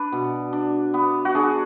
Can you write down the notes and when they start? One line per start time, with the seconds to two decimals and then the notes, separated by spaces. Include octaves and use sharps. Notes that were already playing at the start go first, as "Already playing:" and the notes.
Already playing: D4 B4 D5
0.12 B2
0.53 D4
0.94 B3
1.25 F#4
1.35 D4 G#4